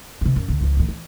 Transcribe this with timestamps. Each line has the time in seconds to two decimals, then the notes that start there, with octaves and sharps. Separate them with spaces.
0.21 C3 D#3
0.36 F#2
0.49 D2 D3
0.61 C#2 F3
0.77 A2 D#3
0.89 E3